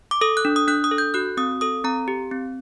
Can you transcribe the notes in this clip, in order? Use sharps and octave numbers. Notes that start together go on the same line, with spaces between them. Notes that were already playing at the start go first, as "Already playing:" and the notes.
D6
A4 D#6
F#6
D4
D#6
D4 F#6
D#6
A4
G6
F#4 F#6
C4 D#6
A4 D#6
C4 A#5
G4
C4